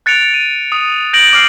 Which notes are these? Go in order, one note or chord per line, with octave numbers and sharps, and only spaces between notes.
F#6 A6 C#7 D7 F7
D#7
D#6
G6 A#6 D7 F#7
D6 F6 C7